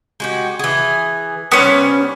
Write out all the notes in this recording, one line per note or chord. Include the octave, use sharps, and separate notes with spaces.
G#3 F#4 G4
E3 G#4
C3 G3 B3 C#4 C#5